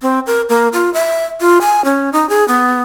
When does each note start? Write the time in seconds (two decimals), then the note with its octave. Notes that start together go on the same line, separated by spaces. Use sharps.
0.02 C4
0.27 A#4
0.49 A#3
0.73 F4
0.94 E5
1.41 F4
1.61 G#5
1.85 C#4
2.13 D#4
2.29 G#4
2.48 B3